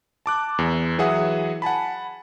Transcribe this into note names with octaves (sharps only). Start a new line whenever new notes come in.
A5 D6 F#6
E2
E3 F#3 G#4 E5 F#5 D#6
F#5 G#5 A5 B5